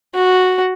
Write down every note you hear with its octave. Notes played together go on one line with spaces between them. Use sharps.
F#4